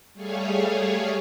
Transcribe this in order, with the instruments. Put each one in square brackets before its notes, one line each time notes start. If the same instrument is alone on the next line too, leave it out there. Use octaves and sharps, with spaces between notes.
[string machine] G3 A3 G#4 C#5 F5